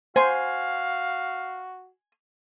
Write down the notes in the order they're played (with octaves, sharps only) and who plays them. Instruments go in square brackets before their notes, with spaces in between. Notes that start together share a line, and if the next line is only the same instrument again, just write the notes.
[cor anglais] F#4 [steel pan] C5 [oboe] F5 [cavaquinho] G#5 C6